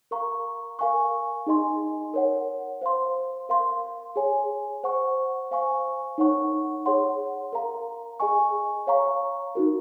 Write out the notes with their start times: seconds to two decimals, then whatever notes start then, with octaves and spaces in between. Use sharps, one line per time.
0.11 A#4 F5 A#5 C#6
0.79 A#4 F5 G#5 C#6
1.47 D#4 G#4 D#5 G#5 C6
2.14 A#4 C#5 F#5
2.81 C5 F5 C6
3.49 A#4 F5 C6
4.16 G#4 C#5 G#5
4.84 C5 F#5 C#6
5.51 C5 F5 G#5 C#6
6.18 D#4 A#4 C#5 F#5 C#6
6.86 G#4 C#5 F#5 C6
7.53 A#4 F5 A#5
8.20 G#4 D#5 G#5 C#6
8.87 C#5 F5 A#5 C#6
9.55 D#4 F#4 A#4